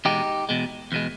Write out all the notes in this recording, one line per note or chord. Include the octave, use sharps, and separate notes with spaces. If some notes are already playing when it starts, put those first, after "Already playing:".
E2 B2 G#3 D#4 G4
E2 B2 G#3
E2 B2 G#3